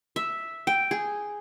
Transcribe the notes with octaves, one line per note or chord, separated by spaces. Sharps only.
E5
G5
G#4